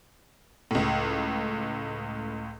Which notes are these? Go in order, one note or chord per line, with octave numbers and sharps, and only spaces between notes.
C#2 A2